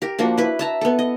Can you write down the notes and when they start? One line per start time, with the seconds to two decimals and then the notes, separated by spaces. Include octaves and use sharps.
0.02 G4 A#4
0.19 F3 A#3 D4 F#4
0.38 E4 B4
0.59 E5 A5 A#5
0.81 B3 A4
0.99 D#5